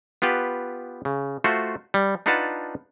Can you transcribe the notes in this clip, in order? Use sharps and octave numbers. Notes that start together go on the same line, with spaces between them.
B3 F4 G4 B4
C#3
A3 F4 F#4 C5
G3
D4 D#4 F4 B4 F#5 A5